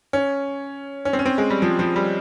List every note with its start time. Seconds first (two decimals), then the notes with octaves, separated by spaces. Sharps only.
0.13 C#4
1.05 C#4
1.13 C4
1.19 C#4
1.26 C4
1.38 G#3
1.50 G3
1.62 F3
1.79 F3
1.96 G3